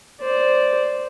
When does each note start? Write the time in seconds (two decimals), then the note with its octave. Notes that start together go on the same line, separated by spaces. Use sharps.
0.20 C5 D5